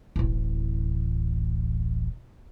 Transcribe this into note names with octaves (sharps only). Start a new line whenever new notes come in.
D1 A1